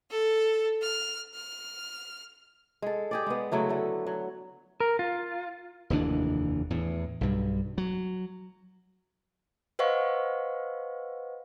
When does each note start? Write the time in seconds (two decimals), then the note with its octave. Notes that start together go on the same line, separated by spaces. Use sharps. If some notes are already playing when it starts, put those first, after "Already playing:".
0.10 A4
0.82 F6
1.34 F6
2.82 G#3 A4
3.11 G4 G#4 D5
3.27 G#3 B3
3.52 C#3 F#3 A3 E4
3.69 D3 A3
4.06 F#3
4.80 A#4
4.99 F4
5.90 F1 D#2 E3 D4
6.70 E2 A2
7.21 B1 G2
7.78 F#3
9.79 B4 C5 D#5 F5 F#5 C#6